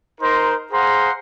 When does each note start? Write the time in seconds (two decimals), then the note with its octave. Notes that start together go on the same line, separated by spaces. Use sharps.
0.21 D#4 A#4 C5 A#5 C6
0.71 G#4 C5 F5 F#5 A#5 C6